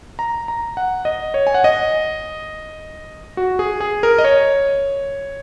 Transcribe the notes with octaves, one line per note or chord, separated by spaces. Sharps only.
A#5
A#5
F#5
D#5
C#5
G#5
F#5
D#5
F#4
G#4
G#4
A#4
D#5
C#5